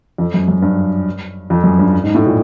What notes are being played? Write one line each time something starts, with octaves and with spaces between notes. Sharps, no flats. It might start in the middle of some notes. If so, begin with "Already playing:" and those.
F2
F#2
F#2
G2
F2
F#2
G2
G#2
A2
A#2